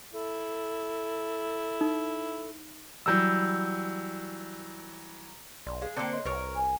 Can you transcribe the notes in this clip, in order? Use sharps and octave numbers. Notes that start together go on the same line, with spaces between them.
E4 A4
D#4
E3 F#3 G3 E6 G6
B1 D5 C6
G#3 G#4 F5
D3 A#3 C4 A5 D6 C#7
C#5 D#5 C6
C2 A#4 B4 C#5 F6
G#5